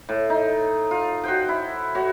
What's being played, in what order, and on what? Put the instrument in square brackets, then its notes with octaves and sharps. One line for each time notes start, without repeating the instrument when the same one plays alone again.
[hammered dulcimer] A2
D#4
F4
F#4 C5 G5
E4
F#4 C#5